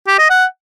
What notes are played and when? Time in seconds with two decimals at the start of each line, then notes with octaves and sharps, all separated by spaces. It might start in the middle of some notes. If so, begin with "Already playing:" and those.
0.07 G4
0.19 D#5
0.30 F#5